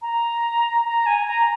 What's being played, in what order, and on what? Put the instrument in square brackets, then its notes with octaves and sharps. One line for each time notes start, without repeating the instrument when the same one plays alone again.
[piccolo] A#5
A#5
G#5
A#5